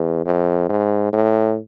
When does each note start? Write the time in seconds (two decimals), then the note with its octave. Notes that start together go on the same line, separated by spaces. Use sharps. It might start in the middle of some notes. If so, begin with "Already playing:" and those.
Already playing: E2
0.26 F2
0.69 G#2
1.13 A2